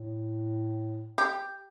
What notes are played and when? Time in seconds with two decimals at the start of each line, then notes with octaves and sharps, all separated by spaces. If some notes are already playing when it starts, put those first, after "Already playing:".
Already playing: A2
1.18 G4